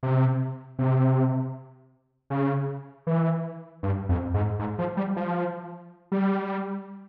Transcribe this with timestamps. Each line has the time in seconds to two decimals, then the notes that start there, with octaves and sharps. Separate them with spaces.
0.03 C3
0.79 C3
2.30 C#3
3.07 E3
3.83 G2
4.09 F2
4.34 G#2
4.59 G#2
4.79 F3
4.97 G3
5.16 F3
6.12 G3